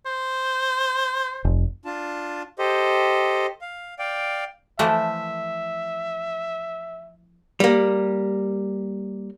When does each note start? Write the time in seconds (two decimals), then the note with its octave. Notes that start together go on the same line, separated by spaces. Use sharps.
0.06 C5
1.45 F1
1.85 D4 F4 A5
2.59 G4 A4 C5 D#5
3.61 F5
3.99 D5 F5 G5
4.79 E3 F3 A3 E5
7.60 G3 A#3